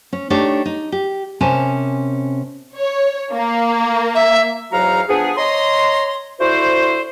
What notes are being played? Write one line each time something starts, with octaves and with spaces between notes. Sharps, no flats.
C#4
A3 D4 D#4 G4 C#5
D#4
G4
C3 C#4 A#4 G#5 A5
C#5
A#3
E5
E2 G#2 F#3 F#4 F5 A#5
F3 B3 D4 G#4
C#5 D#5 A#5 C6
D3 E4 F#4 C5